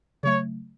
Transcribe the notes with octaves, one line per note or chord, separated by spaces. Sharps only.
C#3 F#3 A3 C#5